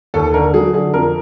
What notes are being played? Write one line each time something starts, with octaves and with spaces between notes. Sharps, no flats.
D#2 A4
D3 A#4
F#3 G#4
D3 G#4
F2 A#4